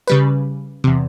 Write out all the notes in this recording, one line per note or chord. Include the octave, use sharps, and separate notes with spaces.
C#3 G3 B4
E2 C3